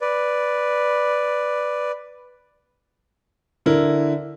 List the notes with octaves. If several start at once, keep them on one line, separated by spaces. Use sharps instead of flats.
B4 D5
D3 E4 A#4